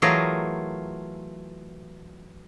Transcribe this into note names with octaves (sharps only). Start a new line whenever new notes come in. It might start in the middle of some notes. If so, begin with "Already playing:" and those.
E3 F#3 A3 F4 G#4 A#4